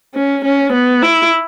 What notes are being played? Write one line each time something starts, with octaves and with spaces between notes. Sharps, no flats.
C#4
C#4
B3
E4